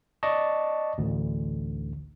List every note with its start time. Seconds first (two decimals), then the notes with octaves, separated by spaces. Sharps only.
0.23 D5 D#5 A5 C#6
0.98 A1 D2